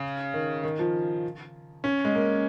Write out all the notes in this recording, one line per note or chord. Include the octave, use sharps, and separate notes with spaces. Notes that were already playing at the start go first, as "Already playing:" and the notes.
Already playing: C#3
D#3
D#3
F3
C#4
G#3
A#3